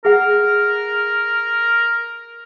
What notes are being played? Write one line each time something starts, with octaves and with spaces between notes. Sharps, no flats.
G#4 A#4 F#5